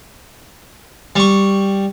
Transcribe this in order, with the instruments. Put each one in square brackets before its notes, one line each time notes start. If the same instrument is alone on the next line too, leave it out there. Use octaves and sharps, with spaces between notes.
[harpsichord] G3 C#6